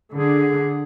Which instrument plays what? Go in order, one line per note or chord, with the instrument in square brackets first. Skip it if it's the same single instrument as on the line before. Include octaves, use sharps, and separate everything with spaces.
[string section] D3 [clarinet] G#4